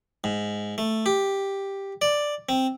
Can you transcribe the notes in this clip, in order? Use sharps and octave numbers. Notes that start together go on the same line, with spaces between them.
G#2
A3
G4
D5
C4